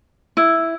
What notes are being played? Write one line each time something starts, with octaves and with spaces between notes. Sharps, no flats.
E4